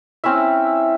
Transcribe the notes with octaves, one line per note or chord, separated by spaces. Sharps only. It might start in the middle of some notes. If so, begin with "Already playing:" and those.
C4 C#4 E4 E5